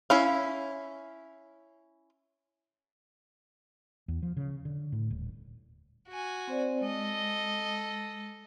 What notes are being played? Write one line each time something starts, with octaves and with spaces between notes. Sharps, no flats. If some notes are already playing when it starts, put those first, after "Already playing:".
C#4 E4 F5
E2
F3
C#3
D3
A2
D#1
F#4 G#5
C4 C5 D5
G#3 A4 D#5